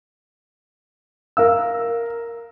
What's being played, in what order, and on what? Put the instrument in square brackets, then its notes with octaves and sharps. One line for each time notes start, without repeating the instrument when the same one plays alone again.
[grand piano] A#4 F5 E6